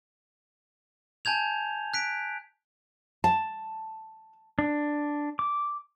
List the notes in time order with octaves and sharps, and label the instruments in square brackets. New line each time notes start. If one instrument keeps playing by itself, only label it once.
[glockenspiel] G#5 A5 G6 G#6 F7
F#6 B6 D7
[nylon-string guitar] A5
[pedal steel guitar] D4
D6